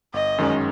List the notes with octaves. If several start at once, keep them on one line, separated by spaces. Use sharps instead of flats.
G1 D#5
F#2 D#3 G#3 C#4